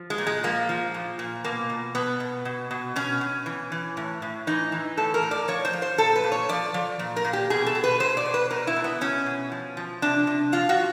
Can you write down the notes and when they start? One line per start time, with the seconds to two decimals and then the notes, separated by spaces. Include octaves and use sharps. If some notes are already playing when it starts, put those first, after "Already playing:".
Already playing: F3
0.10 G#3
0.18 A#2
0.27 G#3
0.43 F3 A#3
0.69 F3
0.94 A#2
1.19 A#2
1.44 B2 A#3
1.70 B2
1.95 B2 B3
2.20 B2
2.45 B2
2.71 B2
2.96 B2 C#4
3.21 B2
3.46 E3
3.72 E3
3.97 A2
4.22 A2
4.47 E3 D#4
4.72 E3
4.97 A2 A4
5.14 A#4
5.23 A2
5.31 D5
5.48 F3 C#5
5.65 C5
5.73 F3
5.82 C5
5.98 A#2 A4
6.16 B4
6.24 A#2
6.32 C#5
6.49 F3 D5
6.74 F3
6.99 A#2
7.16 A#4
7.24 A#2
7.33 G4
7.50 B2 G#4
7.66 A4
7.75 B2
7.84 B4
8.00 B2 C5
8.17 D5
8.26 B2
8.34 B4
8.51 B2 A#4
8.67 E4
8.76 B2
8.84 B3
9.01 B2 C#4
9.26 B2
9.52 F3
9.77 F3
10.02 C3 D4
10.27 C3
10.52 F3 F4
10.69 F#4